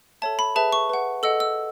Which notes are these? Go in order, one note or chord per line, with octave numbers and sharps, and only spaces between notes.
A4 C#5 E5 A5
B5
G#4 B4 E5 A5
C#6
B4 F#5
A4 D#5 F#5 E6
E6